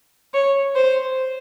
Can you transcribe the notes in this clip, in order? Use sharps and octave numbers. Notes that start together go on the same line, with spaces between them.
C#5
C5